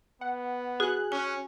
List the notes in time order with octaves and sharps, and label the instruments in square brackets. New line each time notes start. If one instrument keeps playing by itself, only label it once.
[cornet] B3 [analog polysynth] F#5
[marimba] F#4 [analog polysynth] G#4 F#6
[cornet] C#4 [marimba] G#5